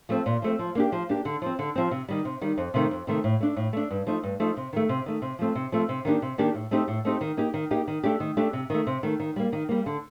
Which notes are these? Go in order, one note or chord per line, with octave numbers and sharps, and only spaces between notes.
F3 A3 C4
A#2
F3 A3 C4
F3
A#3 D4 G4
F3
A#3 D4 G4
D3
F3 C4
D3
F3 C4
C3
D#3 G3
C3
D#3 G3
F2
C3 D#3 A3
F2
C3 D#3 A3
A2
A3 D4
A2
A3 D4
G2
F3 A3 D#4
G2
F3 A3 D#4
C3
D#3 A3
C3
D#3 A3
C3
F3 A3 C4
C3
F3 A3 C4
C3
D#3 A#3 D4 G4
C3
D#3 A#3 D4 G4
A2
A3 C4 D#4 G4
A2
A3 C4 D#4 G4
D#3
A#3 D#4 G4
D#3
A#3 D#4 G4
D#3
A3 D4 G4
D#3
A3 D4 G4
C3
D#3 A3
C3
D#3 A3
D#3
G3 A#3
D#3
G3 A#3
D3